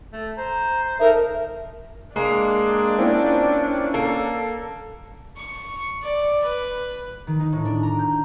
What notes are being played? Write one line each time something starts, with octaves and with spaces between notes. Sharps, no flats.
A3
C5 A#5
D#4 A4 A#4 E5
G#3 A#3 D4
C4 C#4 E4 F4
A#3 A4
C#6
D5
B4
D#3
D#4
A2
D4
A#5
G6